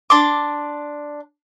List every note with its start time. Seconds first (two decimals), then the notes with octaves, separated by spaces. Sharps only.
0.10 D4 C6 D6